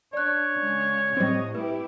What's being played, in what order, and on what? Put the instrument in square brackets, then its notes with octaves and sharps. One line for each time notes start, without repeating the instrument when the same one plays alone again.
[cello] D4 [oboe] C#5 [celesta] D5 F#6
[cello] C#3 G#3
[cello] A2 D#5 [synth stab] G3 C4
[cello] E4 G4 [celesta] B4